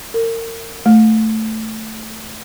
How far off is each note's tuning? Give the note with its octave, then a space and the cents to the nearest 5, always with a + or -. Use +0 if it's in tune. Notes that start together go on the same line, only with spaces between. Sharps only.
A#4 -35
A3 +0